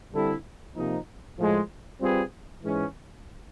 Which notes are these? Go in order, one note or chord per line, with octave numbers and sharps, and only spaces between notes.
D3 G3 C4 E4 A4
C3 F3 A#3 D#4
A2 F3 G#3
G3 C4 F4 G#4 B4
G#2 E3 G#3 C#4